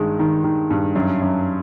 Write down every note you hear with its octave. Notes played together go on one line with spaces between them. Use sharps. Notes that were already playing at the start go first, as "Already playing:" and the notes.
Already playing: G2 D#3 G#3
D#3
D#3
G2
F#2
F#2